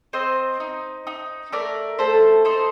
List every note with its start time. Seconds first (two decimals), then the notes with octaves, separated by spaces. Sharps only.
0.13 C4 C5 D#5
0.60 D#4
1.07 D#4
1.52 A3 A#4 D5
1.99 A3 A4 C5
2.45 D#4 A4 C5